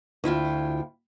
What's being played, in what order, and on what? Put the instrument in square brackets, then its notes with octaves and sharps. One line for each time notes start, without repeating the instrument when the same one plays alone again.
[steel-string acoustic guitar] D2 E4 F4 G5